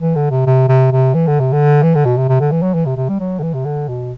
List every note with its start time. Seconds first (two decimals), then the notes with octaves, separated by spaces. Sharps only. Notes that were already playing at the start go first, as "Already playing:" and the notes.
0.01 E3
0.16 D3
0.31 C3
0.47 C3
0.68 C3
0.92 C3
1.14 E3
1.27 D3
1.40 C3
1.53 D3
1.83 E3
1.95 D3
2.05 B2
2.17 C3
2.28 C3
2.40 D3
2.52 E3
2.62 F#3
2.74 E3
2.86 C3
2.97 C3
3.09 G3
3.20 F#3
3.39 D3
3.43 E3
3.54 C3
3.65 D3
3.89 B2